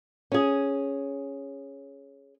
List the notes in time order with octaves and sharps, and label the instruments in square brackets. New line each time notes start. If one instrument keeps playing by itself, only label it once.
[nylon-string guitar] C#4 G#4